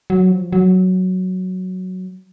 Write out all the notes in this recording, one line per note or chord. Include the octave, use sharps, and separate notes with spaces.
F#3
F3
F#3